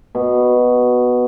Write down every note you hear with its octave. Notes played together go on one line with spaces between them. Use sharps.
B2